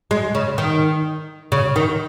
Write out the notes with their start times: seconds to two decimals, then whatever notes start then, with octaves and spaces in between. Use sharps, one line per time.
0.11 G#3
0.35 C#3
0.58 D#3
1.52 C#3
1.76 D#3